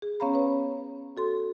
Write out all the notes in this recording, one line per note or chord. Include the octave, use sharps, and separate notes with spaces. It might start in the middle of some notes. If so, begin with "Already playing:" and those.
G#4
B3 C#4 C#5 F5 A#5 B5
B4 C#5
F#4 A4 C6